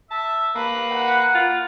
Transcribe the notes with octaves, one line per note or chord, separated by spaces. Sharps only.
E5 A5
A#3 B4
F#5
F4